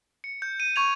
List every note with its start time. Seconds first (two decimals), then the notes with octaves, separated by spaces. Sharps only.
0.24 C#7
0.42 G6
0.60 D#7
0.76 C#6 G#6 F7